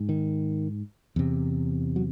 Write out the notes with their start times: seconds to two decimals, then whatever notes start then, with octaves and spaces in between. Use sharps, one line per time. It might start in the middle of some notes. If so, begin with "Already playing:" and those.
Already playing: G#2
0.09 D#3
1.16 E2 C3
1.96 F#3